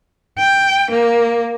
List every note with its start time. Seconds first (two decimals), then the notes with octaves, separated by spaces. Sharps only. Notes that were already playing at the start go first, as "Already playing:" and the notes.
0.38 G5
0.91 A#3